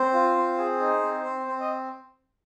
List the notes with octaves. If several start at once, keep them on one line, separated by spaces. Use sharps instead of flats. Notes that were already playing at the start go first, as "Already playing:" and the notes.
Already playing: C4 C5
F4
C4
G#4
D#4
C4
C4
C4
D#5